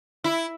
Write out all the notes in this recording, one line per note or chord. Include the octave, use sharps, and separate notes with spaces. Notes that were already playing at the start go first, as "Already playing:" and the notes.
E4